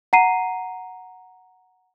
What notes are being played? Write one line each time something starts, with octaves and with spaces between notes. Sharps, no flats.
F#5 A#5 C7 D#7